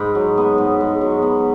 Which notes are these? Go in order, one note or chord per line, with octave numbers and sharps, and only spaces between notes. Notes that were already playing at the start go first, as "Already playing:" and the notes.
Already playing: G#2 B5
F#3
B3
G#2
G#2
F#3
B3